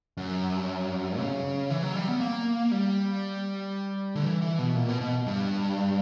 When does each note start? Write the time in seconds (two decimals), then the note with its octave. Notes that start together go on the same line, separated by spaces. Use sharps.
0.17 F#2
1.19 C#3
1.70 E3
1.83 F#3
1.95 G3
2.08 B3
2.21 A#3
2.71 G3
4.15 D3
4.24 E3
4.42 E3
4.59 B2
4.76 A#2
4.88 B2
5.01 B2
5.26 G2